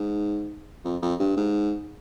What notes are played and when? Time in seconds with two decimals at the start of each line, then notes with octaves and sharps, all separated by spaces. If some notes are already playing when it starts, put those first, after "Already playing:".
Already playing: G#2
0.85 F2
1.02 F2
1.20 G2
1.37 G#2